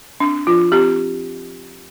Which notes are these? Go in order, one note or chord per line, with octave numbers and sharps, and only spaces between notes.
C4 D4
F3 F4
C4 G4